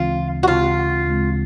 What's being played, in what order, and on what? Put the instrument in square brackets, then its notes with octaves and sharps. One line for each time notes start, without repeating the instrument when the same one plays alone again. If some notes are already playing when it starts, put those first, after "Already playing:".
Already playing: [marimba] D2 C#3 E3 G#3 C4 [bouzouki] F4
[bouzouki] F#4
[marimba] D2 C#3 E3 G#3 C4 [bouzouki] F4
[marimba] D2 C#3 E3 G#3 C4